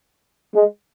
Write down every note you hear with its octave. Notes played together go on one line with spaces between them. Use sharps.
G#3